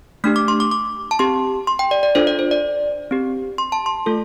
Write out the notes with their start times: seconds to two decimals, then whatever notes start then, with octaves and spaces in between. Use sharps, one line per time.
0.24 A3 D4 G4 F6
0.36 D6
0.48 C6
0.60 D6
0.71 D6
1.11 A5
1.19 C4 G4 C6
1.67 C6
1.79 G5
1.91 D5
2.03 D5
2.15 D4 F4 A4 C5
2.27 D5
2.39 C5
2.51 D5
3.11 C4 G4
3.58 C6
3.72 A5
3.86 C6
4.06 A3 F4 A4